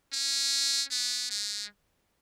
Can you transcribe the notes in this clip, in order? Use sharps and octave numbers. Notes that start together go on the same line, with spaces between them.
C#4
B3
G#3